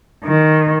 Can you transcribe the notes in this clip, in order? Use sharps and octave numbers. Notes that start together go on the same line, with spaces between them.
D#3